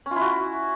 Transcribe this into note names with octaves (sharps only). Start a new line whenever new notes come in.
C#4
F4
E4
F#4